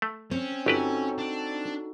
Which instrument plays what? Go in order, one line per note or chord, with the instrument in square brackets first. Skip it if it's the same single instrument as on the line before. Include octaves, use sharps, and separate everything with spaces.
[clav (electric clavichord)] A3
[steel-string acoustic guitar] C4 [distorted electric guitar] C#4
[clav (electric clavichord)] G1 G4 B4 [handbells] D#4 F#4 A4
[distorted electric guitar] D4